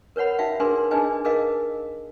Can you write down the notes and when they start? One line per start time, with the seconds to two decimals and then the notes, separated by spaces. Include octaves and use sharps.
0.16 A#4 B4 C#5 F#5 B5
0.39 D#4 F#4 E5 F5 G5
0.60 D4 G#4 A#4 B4 C6
0.91 D4 D#4 G#4 B4 D#5 G#5
1.25 G#4 A#4 B4 D#5 F5